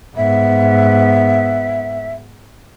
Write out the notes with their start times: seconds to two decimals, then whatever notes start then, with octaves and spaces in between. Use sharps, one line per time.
0.16 G#2 B3 E5